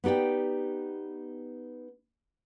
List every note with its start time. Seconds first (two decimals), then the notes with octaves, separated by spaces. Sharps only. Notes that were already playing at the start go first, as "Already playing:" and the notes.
0.04 B3 D#4 G4 D5 G5